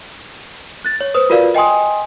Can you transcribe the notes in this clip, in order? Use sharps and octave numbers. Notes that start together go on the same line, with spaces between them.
F#6 A6
C#5
B4 C5 D#6
F4 F#4 A#4 B4 D5 F5
D#5 G5 G#5 C6 D#6